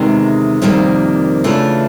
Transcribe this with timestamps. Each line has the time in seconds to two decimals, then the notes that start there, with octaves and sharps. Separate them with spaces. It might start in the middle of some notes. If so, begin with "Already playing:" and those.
Already playing: E2 C3 D#3 G#3
0.62 F2 C3 D#3 G3 A#3
1.44 C#3 E3 A3 D4 F4